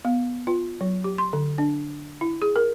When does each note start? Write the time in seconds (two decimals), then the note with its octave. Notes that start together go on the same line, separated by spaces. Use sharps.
0.05 B3
0.47 F4
0.81 F#3
1.04 G4
1.18 C6
1.33 D3
1.58 D4
2.21 E4
2.42 G#4
2.56 A#4